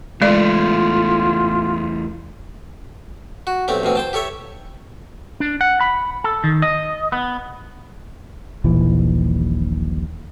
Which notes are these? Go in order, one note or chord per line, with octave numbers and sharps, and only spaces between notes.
E2 G#3 A3 F4 D5
F#4
B1 A3 C4 G4
A1 B2 C4
C5 G5 A5
G4 A4 C#5 E5
D4
F#5
B5
A4
D#3
D#5
B3
D#1 A#1 D#2 E3